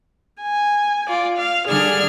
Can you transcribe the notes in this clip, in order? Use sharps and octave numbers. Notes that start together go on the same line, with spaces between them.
G#5
F4 D5
F5
D3 G3 D4 G#4 F6 G#6